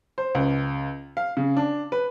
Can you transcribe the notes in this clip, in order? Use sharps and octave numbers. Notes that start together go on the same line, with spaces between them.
C5
C#2
F5
C#3
D4
B4